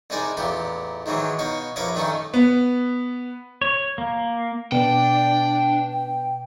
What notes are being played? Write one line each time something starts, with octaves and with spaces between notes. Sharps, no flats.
C2 G#3 D#4 D5 G#5
A1 E2 A#2 B3 G4
G#2 D#3 E3 F#3 G#3
B2 D#4 C#5 F5
A#1 F#2 A#4 B4 C#5 D6
G2 D#3 A3 C#4 D#4
B3
C#5
A#3
B2 D4 D5 G5
G5